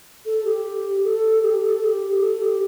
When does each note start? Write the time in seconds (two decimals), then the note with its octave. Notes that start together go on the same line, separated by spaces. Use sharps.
0.26 A4
0.45 G4
1.04 A4
1.43 G4
1.62 A4
1.81 A4
1.85 G4
2.20 A4
2.40 G4